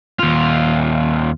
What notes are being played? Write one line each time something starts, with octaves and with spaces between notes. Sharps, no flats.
D#2 F4